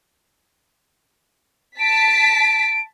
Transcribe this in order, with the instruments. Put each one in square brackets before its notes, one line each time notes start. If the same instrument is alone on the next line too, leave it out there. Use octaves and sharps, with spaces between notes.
[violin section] A5 B6 [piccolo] D7